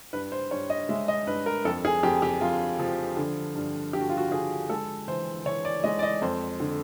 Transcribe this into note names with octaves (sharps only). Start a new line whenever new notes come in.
G2 B4
C5
G2 C#5
D#5
G#3 E5
D#5
G2 B4
A#4
F2 A4
G#4
F2 G4
G4
F2 F4
F3
D3
G2
G2 G4
F#4
F4
F#4
D3 G#4
G#3 A4
E3 C5
E3 C#5
D5
G#3 D#5
D5
D#5
F2 C5
D3